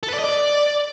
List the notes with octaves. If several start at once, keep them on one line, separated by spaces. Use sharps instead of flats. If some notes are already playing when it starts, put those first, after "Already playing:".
A4
B4
D5
D#5
D5